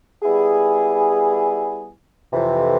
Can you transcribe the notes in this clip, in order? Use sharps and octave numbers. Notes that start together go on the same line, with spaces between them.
G3 B3 E4 G#4
F2 C3 E3